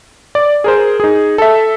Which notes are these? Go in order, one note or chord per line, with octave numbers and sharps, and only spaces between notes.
D5
G#4 A#4 C5
D#4 G#4
A4 E5